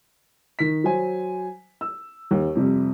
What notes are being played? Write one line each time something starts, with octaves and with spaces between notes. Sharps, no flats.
D#3 B6
F#3 C5 G#5
E6
D#2
F2 C3 G3